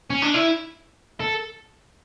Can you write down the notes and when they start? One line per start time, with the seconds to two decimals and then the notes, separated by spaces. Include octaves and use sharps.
0.10 C#4
0.22 D4
0.34 E4
1.20 A4